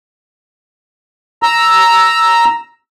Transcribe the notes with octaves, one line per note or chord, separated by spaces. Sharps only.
A#5 E6